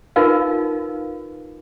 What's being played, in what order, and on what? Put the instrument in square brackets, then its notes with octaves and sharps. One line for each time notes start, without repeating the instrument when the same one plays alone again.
[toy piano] D#4 F4 A#4 B4 F5